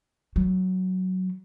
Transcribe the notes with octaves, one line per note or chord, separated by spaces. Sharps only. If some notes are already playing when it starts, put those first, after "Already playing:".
F#3